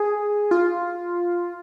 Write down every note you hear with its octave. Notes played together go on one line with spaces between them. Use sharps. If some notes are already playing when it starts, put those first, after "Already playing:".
Already playing: G#4
F4